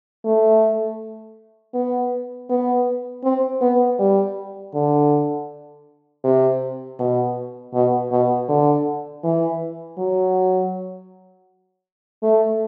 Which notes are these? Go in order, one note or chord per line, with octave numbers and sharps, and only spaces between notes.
A3
B3
B3
C4
B3
G3
D3
C3
B2
B2
B2
D3
E3
F#3
A3